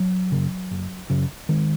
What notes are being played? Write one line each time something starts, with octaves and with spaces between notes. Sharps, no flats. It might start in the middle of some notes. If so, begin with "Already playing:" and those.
Already playing: F#3
F#2 C#3
F#1
F#2 C#3
G#1 D#3 G#3